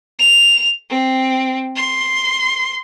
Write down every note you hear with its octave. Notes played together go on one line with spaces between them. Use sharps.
F7
C4
C6